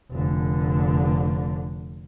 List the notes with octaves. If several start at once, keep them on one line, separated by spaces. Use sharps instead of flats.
F1 D3